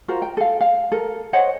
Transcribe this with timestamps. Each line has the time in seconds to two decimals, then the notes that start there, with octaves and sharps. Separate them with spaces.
0.08 F4 F#4 A#4 C5
0.22 G5
0.37 A4 F5
0.61 F5
0.92 A4 A#4
1.33 C5 C#5 D#5 F#5